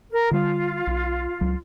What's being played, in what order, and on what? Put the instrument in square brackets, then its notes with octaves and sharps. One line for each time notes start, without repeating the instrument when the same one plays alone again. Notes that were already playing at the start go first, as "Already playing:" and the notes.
[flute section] A#4
[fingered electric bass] D3 G3 [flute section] F4
[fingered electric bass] B1
C#2 F#3